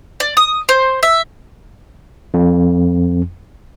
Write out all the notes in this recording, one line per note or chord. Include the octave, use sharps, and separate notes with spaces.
D5
D#6
C5
E5
F2